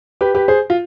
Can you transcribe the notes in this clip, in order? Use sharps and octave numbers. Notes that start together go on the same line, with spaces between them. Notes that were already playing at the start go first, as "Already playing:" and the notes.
G4 B4
G4 B4
G#4 C5
F4